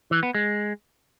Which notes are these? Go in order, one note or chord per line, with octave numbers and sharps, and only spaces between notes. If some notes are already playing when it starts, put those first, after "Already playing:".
E3
B3
G#3